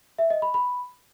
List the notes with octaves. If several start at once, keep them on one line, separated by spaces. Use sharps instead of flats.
E5
D#5
B5
B5